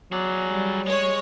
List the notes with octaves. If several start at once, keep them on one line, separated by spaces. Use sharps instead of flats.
F#3 G#4 D5
G3
G#3 C#5